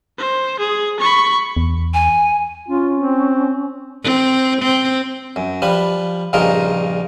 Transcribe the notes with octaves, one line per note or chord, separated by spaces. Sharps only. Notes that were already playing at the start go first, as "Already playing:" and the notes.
C5
G#4
B5 C#6
E2
G#5
C#4 F4
C4
C4
C4
F#2
F3 G3 B4
A#1 G2 C#3 D#4 F4 A#4